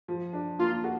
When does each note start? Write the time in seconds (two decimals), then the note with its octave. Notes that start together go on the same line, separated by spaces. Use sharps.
0.08 F3
0.33 D4
0.59 A#3 F4
0.84 F#4